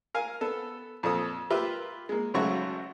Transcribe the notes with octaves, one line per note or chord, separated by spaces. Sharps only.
A#4 F5 G#5
B3 A4
F2 A#2 A4 D#6
F4 G4 A#4 B4 E5
G#3 A#3
G#1 C#3 F#3 A3 F#4 C#6